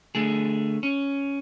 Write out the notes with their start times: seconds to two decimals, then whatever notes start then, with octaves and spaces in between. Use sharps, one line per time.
0.15 D3 A3 G#4
0.83 C#4